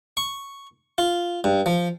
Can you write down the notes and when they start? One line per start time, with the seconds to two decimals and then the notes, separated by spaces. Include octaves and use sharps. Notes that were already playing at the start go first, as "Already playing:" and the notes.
0.17 C#6
0.98 F4
1.44 G2
1.66 F3